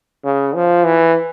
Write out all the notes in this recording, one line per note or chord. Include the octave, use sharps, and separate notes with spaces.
C#3
F3
E3